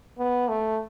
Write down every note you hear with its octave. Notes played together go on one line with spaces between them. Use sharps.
B3
A3